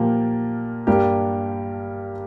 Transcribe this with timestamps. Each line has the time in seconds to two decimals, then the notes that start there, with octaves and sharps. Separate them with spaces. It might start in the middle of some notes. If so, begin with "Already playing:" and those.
Already playing: A#2 F3 A#3 G4
0.87 G2 G3 A#3 D4 G4